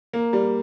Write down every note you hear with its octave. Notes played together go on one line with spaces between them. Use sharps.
A#3
G3